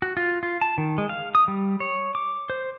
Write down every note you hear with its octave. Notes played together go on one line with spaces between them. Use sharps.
F#4
F4
F4
A5
D#3
G#3
F5
D#6
G3
C#5
D6
C5